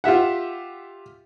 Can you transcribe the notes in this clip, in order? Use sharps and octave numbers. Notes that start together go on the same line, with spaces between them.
F4 G4 E5 F#5